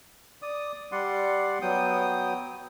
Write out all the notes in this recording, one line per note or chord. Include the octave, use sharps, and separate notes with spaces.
D5 D#6
G3 D5 F#5 C6
F#3 B3 G5 D#6